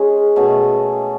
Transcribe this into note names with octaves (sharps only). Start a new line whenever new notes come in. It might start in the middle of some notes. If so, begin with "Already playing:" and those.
Already playing: G#3 C#4 G#4
B2 A3 C#4 G#4